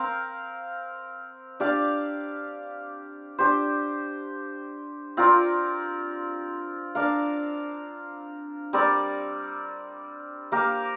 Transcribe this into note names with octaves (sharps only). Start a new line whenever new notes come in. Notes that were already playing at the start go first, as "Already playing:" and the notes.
Already playing: C4 A#4 F5
D4 G4 D5 F5
D4 G4 C5
C4 F4 A#4 D5
D4 A#4 F5
G3 C4 A#4 D5
A#3 G4 A#4 F5